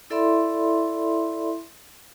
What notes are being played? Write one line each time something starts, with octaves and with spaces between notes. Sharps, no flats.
E4 A4 D5 E5 B5 C6